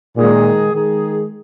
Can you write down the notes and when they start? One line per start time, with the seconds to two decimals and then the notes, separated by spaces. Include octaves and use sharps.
0.16 A#2 D#3 G#3 D#4 G#4
0.72 D#3 G#3 D#4 G#4